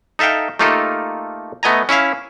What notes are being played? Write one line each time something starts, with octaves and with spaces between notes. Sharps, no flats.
D#4 A4 E5 F5 G5
A3 A#3 D#4 F4 G4 A4
A3 B3 D#5 G#5 A#5
C#4 E4 E5 F5